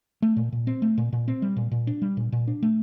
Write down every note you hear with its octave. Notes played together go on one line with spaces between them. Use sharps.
A3
A#2
A#2
C4
A3
A#2
A#2
C4
G3
A#2
A#2
D4
G3
A#2
A#2
D4
A3